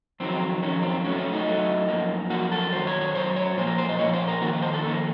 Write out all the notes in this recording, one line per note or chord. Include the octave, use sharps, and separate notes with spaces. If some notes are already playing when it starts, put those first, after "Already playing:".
F2 D#3 F#3 C4
F2 D#3 F#3 C#4
C4
A2 F#3 A3 C#4
C#4
D#4
A2 F#3 A3
F#2 F3 A#3
F#2 F3 A#3 F#4
A4
F#2 D#3 F#3 C5
C#5
C#5
F#2 D#3 F#3 C5
C#5
A#2 F3 A#3 C5
A#4
C5
D#5
A#2 F3 A#3 C#5
C5
A#4
F2 D#3 A#3 F#4
F4
C5
A4
F2 D#3 A#3 A4